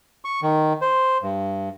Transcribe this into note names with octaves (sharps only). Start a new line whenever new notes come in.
C#6
D#3
C5
G2